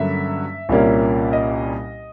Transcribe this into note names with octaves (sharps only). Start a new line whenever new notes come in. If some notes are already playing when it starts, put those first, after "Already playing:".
Already playing: G2 D3 F#3 A#3 C#4 E5
C2 A#2 G3 A#3 C#4
D#5